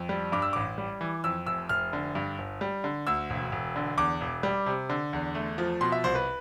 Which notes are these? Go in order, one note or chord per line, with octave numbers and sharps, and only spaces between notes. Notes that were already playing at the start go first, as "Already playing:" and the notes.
Already playing: F2
G3
G2 D6
E6
A1 D6
G3
E3
F2 E6
F1 E6
F1 F6
D3
G2
G1
G3
D3
D2 E6
E1
E1
D3
E2 D6
E1
G3
C3
D3
E2
A3
F3
B2 C6
E5
C2 C5
B4